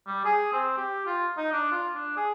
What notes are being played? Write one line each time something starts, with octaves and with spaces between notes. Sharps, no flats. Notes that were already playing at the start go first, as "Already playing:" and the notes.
G3
G#4
C4
G4
F4
D#4
D4
F4
D4
G#4